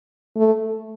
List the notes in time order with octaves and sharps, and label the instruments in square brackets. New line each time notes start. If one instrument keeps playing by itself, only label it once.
[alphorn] A3